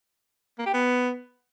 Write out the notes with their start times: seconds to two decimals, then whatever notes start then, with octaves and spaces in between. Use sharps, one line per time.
0.59 A#3
0.66 G4
0.73 B3